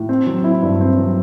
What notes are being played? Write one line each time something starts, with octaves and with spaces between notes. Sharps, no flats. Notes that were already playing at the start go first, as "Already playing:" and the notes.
Already playing: A2
C4
F#3
E4
G2
C4
F#3